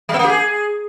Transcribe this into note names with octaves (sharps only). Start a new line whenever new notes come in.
G3
B3
A#3
G4
G#4